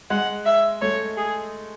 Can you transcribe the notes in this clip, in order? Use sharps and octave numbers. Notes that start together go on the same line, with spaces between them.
G#3 F#5
E5
A3 C#5
G#4